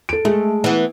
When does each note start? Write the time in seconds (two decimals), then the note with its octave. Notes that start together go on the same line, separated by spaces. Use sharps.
0.09 A4 D7
0.25 G#3 A3
0.64 E3 B3